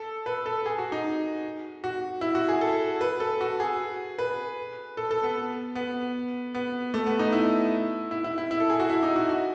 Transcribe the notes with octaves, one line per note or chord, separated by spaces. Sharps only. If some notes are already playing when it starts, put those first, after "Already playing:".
Already playing: A4
B4
A4
G#4
F#4
D#4
F#4
E4
F#4
G#4
A4
B4
A4
F#4
G#4
B4
A4
A4
B3
B3
B3
A3
B3
D#4
E4
E4
E4
E4
E4
A4
G#4
F#4
E4
D#4
F#4
F#4